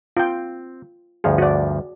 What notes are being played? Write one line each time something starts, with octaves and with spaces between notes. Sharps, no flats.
C4 F4 G5
D2 G2 F3 G#4 F5
F#4 D5